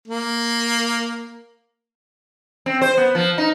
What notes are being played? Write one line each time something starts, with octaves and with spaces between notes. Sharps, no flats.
A#3
C4
C5
B3
F3
D#4